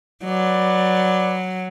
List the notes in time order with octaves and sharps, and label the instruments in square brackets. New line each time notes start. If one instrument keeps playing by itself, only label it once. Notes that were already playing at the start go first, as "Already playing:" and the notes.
[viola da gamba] F#3 [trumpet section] B4 D5